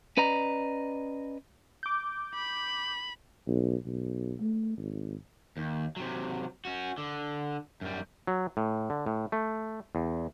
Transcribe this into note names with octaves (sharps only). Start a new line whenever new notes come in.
C#4 B4 D5 D#5 A#5
D6 G6
B5
B1
B1
A3
G#1
D#2
C3 F#3
C#4 F#4
D3
F#2 G3
F#3
A2
D3
A2
A3
E2